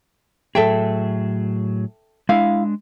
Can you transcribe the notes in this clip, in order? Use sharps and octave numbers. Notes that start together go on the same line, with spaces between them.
A2 F#3 G#4 A4 E5 G5
G#3 D4 E4 F5